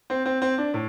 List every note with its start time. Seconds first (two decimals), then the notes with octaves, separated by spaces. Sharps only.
0.10 C4
0.26 C4
0.42 C4
0.58 D4
0.74 A2